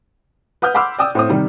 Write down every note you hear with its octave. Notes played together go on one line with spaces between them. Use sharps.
B4 F#5 D#6 F6 G6
F#5 B5 C6 D6 E6 F6
D5 G5 D#6 E6
A2 C4 D#6
C3 D#3 G3